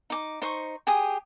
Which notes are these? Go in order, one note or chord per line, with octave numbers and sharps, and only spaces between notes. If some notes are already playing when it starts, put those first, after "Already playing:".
D#4 D6
D#4 C5 C#6
G4 G#4 D#6